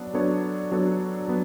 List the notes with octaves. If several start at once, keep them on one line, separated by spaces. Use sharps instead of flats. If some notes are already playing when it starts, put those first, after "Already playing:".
Already playing: F#3 B3 D4
F#3 B3 D4 A4 C#5
F#3 B3 D4 A4 C#5
F#3 B3